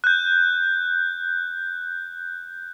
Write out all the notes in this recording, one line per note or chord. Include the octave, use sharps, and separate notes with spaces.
F#6 G6